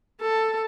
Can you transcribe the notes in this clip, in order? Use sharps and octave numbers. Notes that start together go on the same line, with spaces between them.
A4